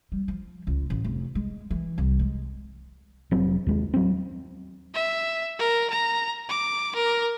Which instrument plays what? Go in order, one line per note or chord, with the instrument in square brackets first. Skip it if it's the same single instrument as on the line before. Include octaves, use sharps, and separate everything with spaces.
[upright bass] G3
F3
C#2
A1
F1
G#3
E3
C2
G#3
[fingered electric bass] F1 F#3 C4
D#2 G#3
F#3 C4
[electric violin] E5
A#4
A#5
D6
A#4